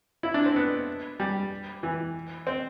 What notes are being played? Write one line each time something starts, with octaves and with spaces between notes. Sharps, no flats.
E4
D4
C4
B3
G3
E3
C4